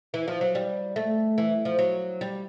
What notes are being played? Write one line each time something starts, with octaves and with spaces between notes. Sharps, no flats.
E3
F3
F#3
G3
A3
E3
F3
F#3
G3